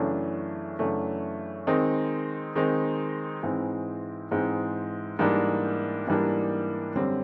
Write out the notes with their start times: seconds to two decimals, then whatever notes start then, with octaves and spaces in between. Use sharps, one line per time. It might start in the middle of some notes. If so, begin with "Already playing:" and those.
Already playing: F#2 C#3 E3 A3 D4
0.79 F#2 C#3 E3 A3 D4
1.67 D#3 G#3 C4 D#4
2.55 D#3 G#3 C4 D#4
3.43 G#2 E3 G#3 C4
4.31 G#2 E3 G#3 C4
5.19 G#2 E3 G3 A#3 D4
6.07 G#2 E3 G3 A#3 D4
6.96 F#2 D3 G3 C4